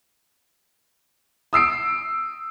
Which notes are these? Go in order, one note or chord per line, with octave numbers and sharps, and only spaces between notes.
D#6 E6 C7 D7